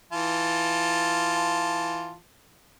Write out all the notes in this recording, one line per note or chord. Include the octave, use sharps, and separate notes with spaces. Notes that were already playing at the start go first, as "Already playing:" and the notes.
E3 F4 A5